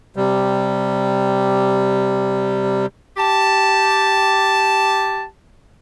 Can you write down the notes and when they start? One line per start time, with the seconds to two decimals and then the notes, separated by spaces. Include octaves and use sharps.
0.16 C3 G3
3.17 G4 A5